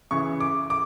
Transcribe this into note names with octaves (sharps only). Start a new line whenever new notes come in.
C#3 E3 C#6
D6
D6